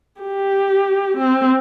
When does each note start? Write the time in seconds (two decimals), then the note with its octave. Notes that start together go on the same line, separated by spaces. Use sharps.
0.21 G4
1.17 C4